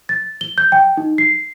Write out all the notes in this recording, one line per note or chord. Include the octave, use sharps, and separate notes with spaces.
A6
G7
G6
G5
D#4
C7